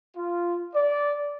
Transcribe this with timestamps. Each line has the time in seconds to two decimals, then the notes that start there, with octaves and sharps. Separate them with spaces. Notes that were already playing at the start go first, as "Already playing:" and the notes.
0.16 F4
0.74 D5